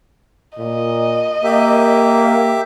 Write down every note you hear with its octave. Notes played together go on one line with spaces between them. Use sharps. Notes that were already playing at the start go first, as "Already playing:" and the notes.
A#2 D#5
A#3 G4 E5